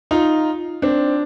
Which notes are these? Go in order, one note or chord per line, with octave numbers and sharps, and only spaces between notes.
D#4 F4
C4 D4